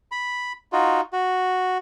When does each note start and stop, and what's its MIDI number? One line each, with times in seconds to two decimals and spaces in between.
0.12 0.52 83
0.73 1.01 63
0.73 1.01 65
0.73 1.01 66
1.13 1.78 66